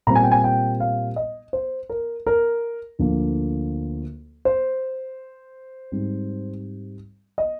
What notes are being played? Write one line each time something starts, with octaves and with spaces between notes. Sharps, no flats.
A#2 G3 C4 A#5
G#5
G5
G#5
G5
F5
D#5
C5
A#4
A#4
D2 D3 F3 A#3
C5
G#2 G3 C4
D#5